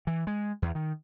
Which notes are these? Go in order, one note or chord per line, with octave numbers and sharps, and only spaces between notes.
E3
G#3
E2
D#3